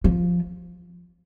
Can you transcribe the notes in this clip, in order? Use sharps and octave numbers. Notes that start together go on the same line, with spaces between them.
F3